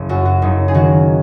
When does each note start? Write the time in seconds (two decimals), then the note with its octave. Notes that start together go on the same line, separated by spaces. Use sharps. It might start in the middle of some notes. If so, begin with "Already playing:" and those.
Already playing: F#1
0.09 F#2 F#4
0.25 F#4
0.42 F#1 D#4
0.68 G#4
0.74 D#3 F#4